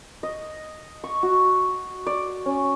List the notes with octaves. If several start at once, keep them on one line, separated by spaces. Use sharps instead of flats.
D#5
C#6
F#4
D5
C#4